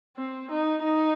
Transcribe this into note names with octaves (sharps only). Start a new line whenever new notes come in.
C4
D#4
D#4